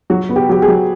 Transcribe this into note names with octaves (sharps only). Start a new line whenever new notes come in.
F#3 F#4
B3
G4
F#3 G4
G#4
F#3